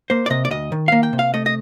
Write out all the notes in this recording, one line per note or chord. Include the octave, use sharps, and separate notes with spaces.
A#3 C5
D5
C3 D#5
D5
D2 D#5
D#3
A#3 F5
G5
C3
F5
A3 D#5
D#5